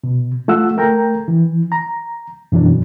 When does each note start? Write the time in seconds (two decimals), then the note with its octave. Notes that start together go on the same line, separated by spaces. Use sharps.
0.04 B2
0.48 A3 F4 F#5 E6
0.77 A3 A#4 G5 A#5
1.28 E3
1.72 A#5
2.52 F#2 B2 E3 F#3 D4